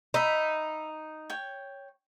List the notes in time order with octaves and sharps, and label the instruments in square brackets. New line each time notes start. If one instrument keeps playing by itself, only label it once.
[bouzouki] D#4 [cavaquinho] D#5 E5 B5
[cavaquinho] C#5 G5